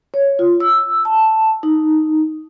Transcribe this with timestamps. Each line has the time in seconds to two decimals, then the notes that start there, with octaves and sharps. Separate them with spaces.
0.14 C#5
0.39 F4
0.60 E6
1.05 A5
1.63 D#4